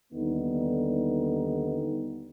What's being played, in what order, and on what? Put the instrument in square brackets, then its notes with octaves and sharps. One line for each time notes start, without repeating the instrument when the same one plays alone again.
[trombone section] D#2 D3 G3 B3 D#4